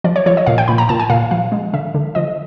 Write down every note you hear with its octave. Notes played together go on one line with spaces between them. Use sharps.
F3 D5
C#5
F3 C#5
D#5
A#2 F5
G5
A#2 B5
A#5
A#2 A5
G#5
A#2 F5
F3 F5
G#3
D3 E5
D3
F3 D#5